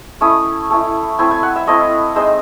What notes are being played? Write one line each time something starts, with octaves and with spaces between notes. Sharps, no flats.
A3 C#4 E4 D#6
A3 C#4 E4
A3 C4 E4 G#5
G#5
F#5
E5
A3 C4 E4 D#5
G#3 C4 D#4 C5